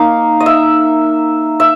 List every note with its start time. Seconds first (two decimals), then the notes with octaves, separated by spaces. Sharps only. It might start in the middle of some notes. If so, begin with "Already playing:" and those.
Already playing: A#3 D#4 F5
0.40 D#5
0.46 E5
1.60 E5